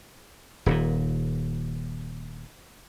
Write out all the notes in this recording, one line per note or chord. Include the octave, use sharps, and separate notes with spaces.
D#1 D#2 A#2